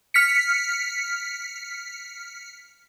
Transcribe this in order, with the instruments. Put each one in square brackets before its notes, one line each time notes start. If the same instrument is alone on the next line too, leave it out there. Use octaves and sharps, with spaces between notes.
[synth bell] F6 B6 C#7